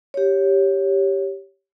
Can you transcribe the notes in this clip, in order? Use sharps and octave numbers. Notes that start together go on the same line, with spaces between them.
G4 C#5